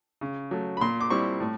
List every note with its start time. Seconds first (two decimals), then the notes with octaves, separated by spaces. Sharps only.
0.21 C#3
0.51 F#3 A3
0.77 B5
0.81 A#2 C6
1.00 D6
1.10 G3 C4 E4 C#6
1.40 A2